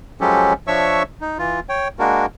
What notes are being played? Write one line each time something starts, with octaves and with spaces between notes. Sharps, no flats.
F3 F#3 G#3 C#4 G4 A4
F3 D4 C#5 E5 C#6 E6
D#4
E3 F4
C#5 G5
G#3 A#3 D4 F#4 A#4